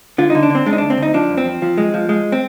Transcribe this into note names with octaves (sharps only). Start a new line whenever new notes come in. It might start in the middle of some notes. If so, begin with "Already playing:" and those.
D3 F4
D3 D#4
D4
D3 C4
G#3 D4
D#4
D2 D4
C4
D2 D#4
F3 D4
F2
C4
F3
F3
G#3
F3
G#3
C4